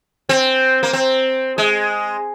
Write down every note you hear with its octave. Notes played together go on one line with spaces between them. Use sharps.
C4
A#3
C4
G#3